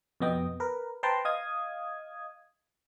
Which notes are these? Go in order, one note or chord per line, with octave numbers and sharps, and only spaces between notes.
F2 B2 B3 D#5 G5
A#4 B4
B4 C5 G5 A5 A#5 C6
D#5 F5 D#6 G#6